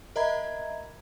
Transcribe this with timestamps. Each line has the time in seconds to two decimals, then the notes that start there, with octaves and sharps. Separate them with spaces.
0.16 A#4 D#5 E5 A#5 B5 G#6